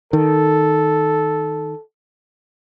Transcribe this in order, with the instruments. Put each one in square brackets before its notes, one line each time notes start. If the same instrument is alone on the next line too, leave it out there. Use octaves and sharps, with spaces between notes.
[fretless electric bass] D#3 [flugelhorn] A4